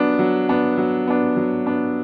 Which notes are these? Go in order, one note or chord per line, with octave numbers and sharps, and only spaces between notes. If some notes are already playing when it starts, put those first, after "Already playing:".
Already playing: F#3 B3 D4
F#3
B3 D4
F#3
B3 D4
F#3
B3 D4